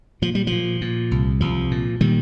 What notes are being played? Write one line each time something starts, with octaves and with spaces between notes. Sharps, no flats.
A#2 F3
G3
F3
A#2
A#2
C2
C2 F3
A#2
A#2 D#3 G3